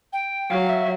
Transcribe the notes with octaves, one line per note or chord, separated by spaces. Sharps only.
G5
F#3 F5
E5